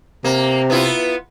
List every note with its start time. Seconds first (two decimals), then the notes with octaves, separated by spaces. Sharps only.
0.24 C3 A#3
0.70 B3 E4 F4